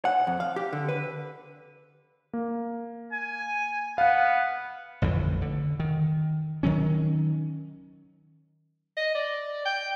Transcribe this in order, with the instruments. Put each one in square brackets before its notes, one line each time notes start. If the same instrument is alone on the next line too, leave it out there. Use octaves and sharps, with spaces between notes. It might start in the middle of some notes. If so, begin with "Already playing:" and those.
[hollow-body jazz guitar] F#5
F2
F5
G4
D3
B4
[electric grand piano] A#3
[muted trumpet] G#5
[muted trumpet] B3 [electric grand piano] F5 F#5
[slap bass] A1 F2 D3 E3
D3
D#3
D#3 F#3 C#4
[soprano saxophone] D#5
D5
G5